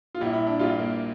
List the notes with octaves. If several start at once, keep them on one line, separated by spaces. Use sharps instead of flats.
F4
A#1 A#2 G3 E4
E4
D4
A#1 A#2 G3 F4
A#3